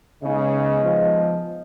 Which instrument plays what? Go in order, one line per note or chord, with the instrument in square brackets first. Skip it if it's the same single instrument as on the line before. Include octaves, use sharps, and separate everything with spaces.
[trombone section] C#3 [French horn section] G#3 B3 D#4 G#4 D#5
[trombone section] F3